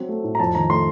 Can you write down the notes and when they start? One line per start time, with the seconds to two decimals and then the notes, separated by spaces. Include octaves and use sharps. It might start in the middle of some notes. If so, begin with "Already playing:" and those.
Already playing: F#3 C4
0.09 A3
0.24 A2
0.35 A#5
0.40 F2 A5
0.55 D#3 A#5
0.70 A3 C6